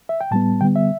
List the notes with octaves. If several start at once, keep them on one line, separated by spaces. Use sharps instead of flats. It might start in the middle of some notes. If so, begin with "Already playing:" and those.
E5
G5
A2 G3 B3 A5
D3 G3 B3 G5
E5